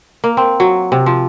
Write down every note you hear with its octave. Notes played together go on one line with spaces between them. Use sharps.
A#3
C4
F#3
C3
F3